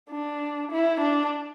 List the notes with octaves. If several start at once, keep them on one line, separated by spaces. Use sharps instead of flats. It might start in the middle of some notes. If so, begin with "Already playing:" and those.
D4
E4
D4